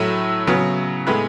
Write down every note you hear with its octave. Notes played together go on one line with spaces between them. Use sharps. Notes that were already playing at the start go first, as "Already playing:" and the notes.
Already playing: A2 F#3 A3 E6
C#3 F#3 B3
A2 G#3 B3 B5